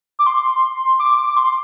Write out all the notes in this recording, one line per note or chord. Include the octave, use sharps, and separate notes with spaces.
D6
C6
D6
D6
C6